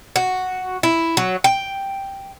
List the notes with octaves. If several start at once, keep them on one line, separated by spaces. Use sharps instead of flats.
F#4
E4
F#3
G5